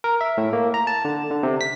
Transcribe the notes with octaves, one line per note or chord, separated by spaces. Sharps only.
A#4
E5
A2
A#3
A#5
A5
D3
D3
C3
B6